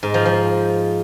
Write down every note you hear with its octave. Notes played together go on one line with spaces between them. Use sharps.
G#2
F3
F3